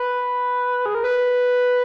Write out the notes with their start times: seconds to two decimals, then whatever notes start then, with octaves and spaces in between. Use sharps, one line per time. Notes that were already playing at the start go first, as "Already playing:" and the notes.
Already playing: B4
0.86 G#4
0.95 A#4
1.04 B4